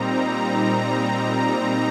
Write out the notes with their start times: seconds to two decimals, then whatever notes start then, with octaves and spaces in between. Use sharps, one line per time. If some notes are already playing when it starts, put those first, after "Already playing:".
Already playing: A#2 G3 C4 D#4 A#5
0.32 A#5